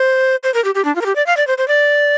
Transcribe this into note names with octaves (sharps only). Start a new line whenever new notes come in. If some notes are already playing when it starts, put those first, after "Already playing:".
Already playing: C5
C5
A#4
G4
G4
D4
F4
A#4
G4
D5
F5
D5
C5
C5
D5